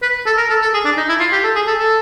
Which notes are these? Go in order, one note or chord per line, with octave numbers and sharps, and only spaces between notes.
B4
A4
A#4
A4
A4
G#4
D4
D#4
E4
F4
G4
A4
G#4
A4
A4